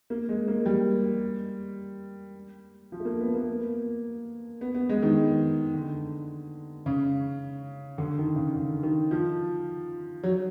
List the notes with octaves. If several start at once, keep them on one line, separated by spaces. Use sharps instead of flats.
A#3
G#3
A#3
G3
F3
A3
A#3
B3
A#3
B3
B3
G#3
D#3
D3
C#3
D3
D#3
C#3
D3
D#3
F3
F#3